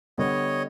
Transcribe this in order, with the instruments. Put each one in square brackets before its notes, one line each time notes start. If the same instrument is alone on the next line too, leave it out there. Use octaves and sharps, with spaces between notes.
[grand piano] D3 G3 B3 [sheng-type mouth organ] C#5 D#5